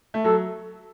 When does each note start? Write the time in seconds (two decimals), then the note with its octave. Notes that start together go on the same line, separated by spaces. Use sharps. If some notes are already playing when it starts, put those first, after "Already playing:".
0.14 A3
0.24 F#3 A4